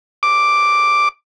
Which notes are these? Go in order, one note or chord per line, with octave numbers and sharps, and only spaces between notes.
D6